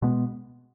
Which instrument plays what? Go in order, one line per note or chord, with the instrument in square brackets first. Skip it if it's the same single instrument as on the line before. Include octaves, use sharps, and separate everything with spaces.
[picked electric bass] B2 G#3 B3